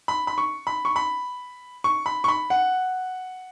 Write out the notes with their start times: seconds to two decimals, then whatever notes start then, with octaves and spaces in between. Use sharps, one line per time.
0.08 B5
0.27 B5
0.38 C#6
0.67 B5
0.85 C#6
0.96 B5
1.84 C#6
2.06 B5
2.24 C#6
2.28 B5
2.50 F#5